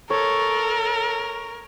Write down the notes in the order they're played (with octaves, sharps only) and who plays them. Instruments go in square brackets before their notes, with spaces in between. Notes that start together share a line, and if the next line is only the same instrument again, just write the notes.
[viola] A4 [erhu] A#4 [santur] C#5